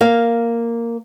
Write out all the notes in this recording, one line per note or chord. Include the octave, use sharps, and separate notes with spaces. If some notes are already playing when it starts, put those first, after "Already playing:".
A#3 F5